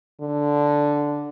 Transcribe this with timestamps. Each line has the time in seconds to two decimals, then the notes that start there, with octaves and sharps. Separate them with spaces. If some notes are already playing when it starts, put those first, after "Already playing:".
0.21 D3